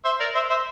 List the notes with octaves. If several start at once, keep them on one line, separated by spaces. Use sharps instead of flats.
C5 E5
A#4 D5
C5 E5
C5 E5